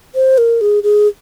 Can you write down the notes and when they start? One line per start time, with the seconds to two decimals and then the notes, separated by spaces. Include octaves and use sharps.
0.15 C5
0.38 A#4
0.61 G#4
0.83 G#4